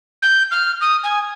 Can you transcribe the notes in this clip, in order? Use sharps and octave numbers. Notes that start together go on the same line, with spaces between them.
G6
F6
D#6
G#5